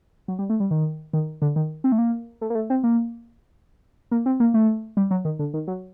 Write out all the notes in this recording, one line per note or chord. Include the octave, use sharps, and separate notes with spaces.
F#3
G3
A3
G3
D#3
D#3
D3
D#3
C4
A3
A#3
A3
A#3
A3
C4
A#3
A#3
C4
A#3
A3
G3
F#3
D#3
D3
D#3
F#3